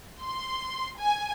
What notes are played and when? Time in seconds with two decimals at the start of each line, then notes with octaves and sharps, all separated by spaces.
0.20 C6
0.97 G#5